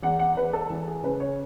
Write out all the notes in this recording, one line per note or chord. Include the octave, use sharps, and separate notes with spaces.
E2 F#5
F#5
E2 B4
A4
E3
G#4
C#3 B4
C#5